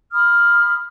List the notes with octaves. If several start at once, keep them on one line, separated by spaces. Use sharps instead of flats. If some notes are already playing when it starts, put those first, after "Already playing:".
B5 D#6 F6